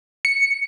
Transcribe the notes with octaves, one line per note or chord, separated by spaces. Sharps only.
C#7